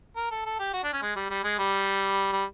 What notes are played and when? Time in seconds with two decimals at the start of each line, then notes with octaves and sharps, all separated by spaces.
0.16 A#4
0.31 A4
0.46 A4
0.59 G4
0.73 F#4
0.84 D4
0.93 C#4
1.02 G#3
1.16 G3
1.30 G3
1.44 G#3
1.59 G3
2.33 G3